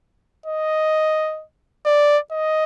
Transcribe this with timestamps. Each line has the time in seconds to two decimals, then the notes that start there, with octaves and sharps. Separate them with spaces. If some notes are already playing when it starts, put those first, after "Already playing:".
0.46 D#5
1.86 D5
2.32 D#5